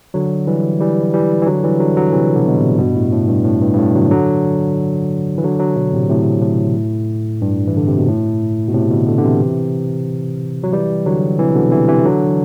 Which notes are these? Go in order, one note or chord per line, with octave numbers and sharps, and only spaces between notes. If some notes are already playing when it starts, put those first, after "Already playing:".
D3 F#3
E3 G3
E3 G3
E3 G3
E3
D3 F#3
E3 G3
D3 F#3
D3 F#3
C3 E3
B2 D3
B2
A2 C3
G2 B2
A2
A2
G2
A2
G2
G2
A2
D3 F#3
D3 F#3
E3
D3 F#3
D3 F#3
B2 D3
A2 C3
A2 C3
A2
G2
E3
D3
C3
B2
A2
B2
A2 C3
B2 D3
B2 D3
D3
C3 E3
F#3
E3 G3
D3 F#3
C3 E3
B2 D3
C3 E3
C3 E3
D3 F#3
E3